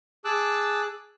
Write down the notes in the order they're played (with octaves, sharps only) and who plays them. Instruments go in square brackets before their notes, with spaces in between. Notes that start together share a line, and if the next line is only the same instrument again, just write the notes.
[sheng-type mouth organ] G#4 A5 D6 E6 F#6